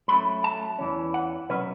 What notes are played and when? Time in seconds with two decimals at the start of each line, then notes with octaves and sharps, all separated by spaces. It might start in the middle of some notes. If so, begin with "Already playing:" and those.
0.08 A2 F#3 A3 C#4 B5
0.44 A5
0.78 E2 E3 C#4
1.14 F#5
1.49 B2 F#3 C#4 B4